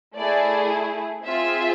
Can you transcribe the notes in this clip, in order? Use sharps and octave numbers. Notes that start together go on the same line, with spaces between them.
A3 E4 G#4 D5
C4 F4 G#4 E5